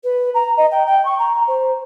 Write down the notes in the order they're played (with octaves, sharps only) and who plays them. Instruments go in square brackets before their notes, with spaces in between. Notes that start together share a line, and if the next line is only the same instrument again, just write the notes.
[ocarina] B4
A#5
D#5
G5
G5
C#6
A#5
C5